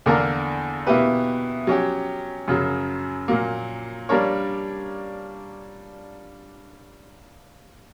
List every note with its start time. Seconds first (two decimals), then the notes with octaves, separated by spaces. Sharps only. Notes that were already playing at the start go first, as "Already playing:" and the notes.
0.06 E2 D3 A#3 D4 A#4
0.87 B2 A#3 E4 G4 B4
1.67 F#3 C#4 G4
2.48 F#2 C#3 F#3
3.28 A#2 F#3 A#3
4.09 G3 A#3 D4 A#4 C#5